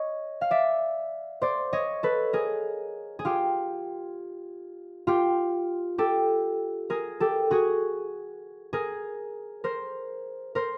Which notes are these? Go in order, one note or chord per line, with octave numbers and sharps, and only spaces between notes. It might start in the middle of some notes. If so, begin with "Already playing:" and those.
Already playing: C#5 D#5
F5
D5 E5
C5 D5
C#5 D#5
A4 B4
G#4 A#4
G#4
F4 G4
F4 G4
G4 A4
G#4 A#4
G4 A4
F#4 G#4
G#4 A#4
A#4 C5
A#4 C5